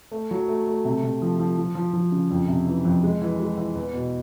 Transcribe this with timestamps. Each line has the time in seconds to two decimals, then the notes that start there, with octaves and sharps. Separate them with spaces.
0.11 A3
0.31 F#3
0.48 A3
0.67 A3
0.85 C3
1.03 C3
1.22 F3
1.40 F3
1.58 F3
1.75 F3
1.93 F3
2.12 C#3
2.31 F2
2.48 C3
2.67 E3
2.85 F2
3.04 G#3
3.22 E3
3.40 G#3
3.57 E3
3.76 E2
3.94 B2